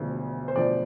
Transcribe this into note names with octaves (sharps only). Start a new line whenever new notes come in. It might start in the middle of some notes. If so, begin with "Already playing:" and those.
Already playing: E1 D2 D3 F3
C5
E1 D2 D3 F3 D5